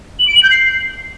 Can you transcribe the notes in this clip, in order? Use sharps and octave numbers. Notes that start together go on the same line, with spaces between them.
F#7
D7
F#7
G6
C7